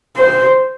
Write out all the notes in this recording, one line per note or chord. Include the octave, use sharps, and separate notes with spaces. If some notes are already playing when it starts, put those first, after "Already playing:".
C5